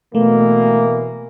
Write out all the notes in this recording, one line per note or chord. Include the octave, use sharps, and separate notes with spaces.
B2 E3 A3 A#3